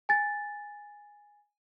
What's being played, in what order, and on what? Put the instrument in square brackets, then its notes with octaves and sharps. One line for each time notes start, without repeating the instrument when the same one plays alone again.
[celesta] G#5 A6